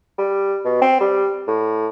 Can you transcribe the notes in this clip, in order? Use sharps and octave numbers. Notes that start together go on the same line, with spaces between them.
G3
B2
C4
G3
A2